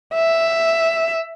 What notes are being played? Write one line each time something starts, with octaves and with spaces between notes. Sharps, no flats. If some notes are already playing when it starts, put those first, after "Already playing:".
E5